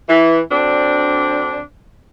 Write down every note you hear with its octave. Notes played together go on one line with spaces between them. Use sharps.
E3
D2 C4 D4